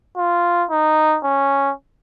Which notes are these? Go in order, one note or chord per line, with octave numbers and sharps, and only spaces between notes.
F4
D#4
C#4